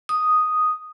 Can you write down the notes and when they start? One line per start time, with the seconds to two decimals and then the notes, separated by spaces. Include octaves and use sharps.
0.09 D#6